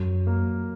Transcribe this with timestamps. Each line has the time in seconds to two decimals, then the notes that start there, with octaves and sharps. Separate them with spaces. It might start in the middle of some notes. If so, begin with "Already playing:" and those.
Already playing: F#2 F#3
0.27 A#3